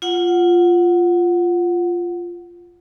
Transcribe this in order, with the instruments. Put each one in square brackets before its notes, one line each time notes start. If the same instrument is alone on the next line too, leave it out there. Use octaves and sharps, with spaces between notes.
[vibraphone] F4 F#5